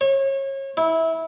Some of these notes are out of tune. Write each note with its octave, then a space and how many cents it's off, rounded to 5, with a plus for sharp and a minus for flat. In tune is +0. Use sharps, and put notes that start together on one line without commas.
C#5 -30
E4 -20